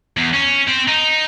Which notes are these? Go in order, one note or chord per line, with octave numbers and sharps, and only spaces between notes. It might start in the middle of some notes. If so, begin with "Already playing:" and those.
E2
C#4
C4
D#4